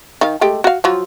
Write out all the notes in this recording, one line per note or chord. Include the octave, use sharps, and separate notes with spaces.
D#3 F5
G#3 A3 G4
F#4 F5
F3 F#3 F4